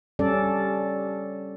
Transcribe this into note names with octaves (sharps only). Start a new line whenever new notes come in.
G3 C#4 A4 D5